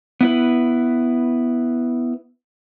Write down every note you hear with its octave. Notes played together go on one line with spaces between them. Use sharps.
B3 E4 B4